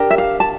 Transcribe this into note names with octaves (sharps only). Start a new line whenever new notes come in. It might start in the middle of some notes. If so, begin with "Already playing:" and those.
Already playing: D4 G4 A#4
E5
F5
A5